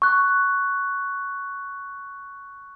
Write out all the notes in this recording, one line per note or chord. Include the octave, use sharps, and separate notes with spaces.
C#6 F#6